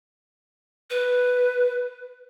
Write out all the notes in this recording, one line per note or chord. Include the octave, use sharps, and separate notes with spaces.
B4